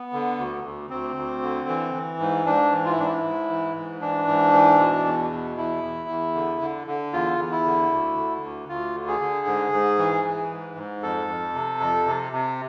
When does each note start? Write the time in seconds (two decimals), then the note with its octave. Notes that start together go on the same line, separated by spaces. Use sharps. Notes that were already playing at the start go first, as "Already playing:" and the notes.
Already playing: B3
0.13 D3
0.38 D2
0.64 D2
0.90 D2 C4
1.16 D2
1.42 D3
1.68 E3
1.94 E3
2.20 G#2
2.46 G#2 D4
2.72 E3
2.85 F4
2.92 E4
2.98 G#2 D4
3.06 E4
3.24 G#2
3.50 E3
3.75 G#2
4.01 E3 D4
4.28 G#2
4.53 E3
4.79 B2
5.05 E2
5.32 B2
5.57 E2 E4
5.83 E2
6.09 E2
6.35 D3
6.62 D3
6.87 D3
7.13 E2 F4
7.39 E2
7.52 E4
7.65 D3
7.91 D2
8.17 D3
8.43 D2
8.69 D2 F4
8.95 D3
9.08 G#4
9.21 D3
9.47 G#2
9.73 G#2
9.98 E3
10.24 E3
10.51 G#2
10.77 G#2
11.02 F2 A4
11.28 F2
11.54 C3
11.80 F2
12.06 C3
12.32 C3